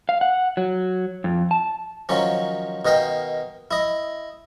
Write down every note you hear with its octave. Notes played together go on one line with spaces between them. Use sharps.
F5
F#5
F#3
F2
A5
D#3 F3 F#3 C#4
B2 D#3 D#5 F5 G5
E4 D#5